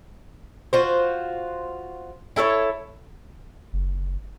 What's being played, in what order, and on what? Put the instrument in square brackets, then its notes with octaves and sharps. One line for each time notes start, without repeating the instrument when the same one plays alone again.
[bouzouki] F4 F#4 C5
E4 A4 B4 C#5
[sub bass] F#1